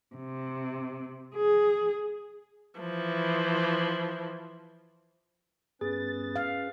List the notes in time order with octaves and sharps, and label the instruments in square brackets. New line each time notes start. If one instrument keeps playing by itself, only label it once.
[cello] C3
G#4
[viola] E3 F3
[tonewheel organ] G2 B3 A6 [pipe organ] C#4 B4 [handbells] G#4
[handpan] F5